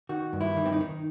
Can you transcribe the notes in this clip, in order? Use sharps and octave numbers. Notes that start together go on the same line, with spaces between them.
D#3 F#4
G2
E4
D#3
C4
D#4
D#3